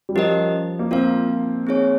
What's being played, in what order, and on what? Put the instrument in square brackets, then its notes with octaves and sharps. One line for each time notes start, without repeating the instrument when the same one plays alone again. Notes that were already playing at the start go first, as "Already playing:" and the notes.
[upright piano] G3
[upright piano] F3 [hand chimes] C#4 G4 A#4 D#5
[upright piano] A#3
[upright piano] C4 [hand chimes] F4 A#4 F5
[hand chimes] C4 D#4 G#4 C#5